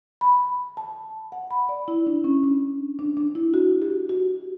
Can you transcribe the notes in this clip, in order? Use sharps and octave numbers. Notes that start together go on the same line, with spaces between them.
B5
A5
F#5
B5
D5
E4
D4
C#4
D4
D4
D4
E4
F#4
G4
F#4